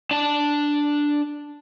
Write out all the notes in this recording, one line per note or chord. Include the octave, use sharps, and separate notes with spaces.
D4 A5